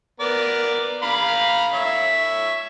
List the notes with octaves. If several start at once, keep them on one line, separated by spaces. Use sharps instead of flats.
B3 A#4 D5
F5 A#5 B5
C#5 E5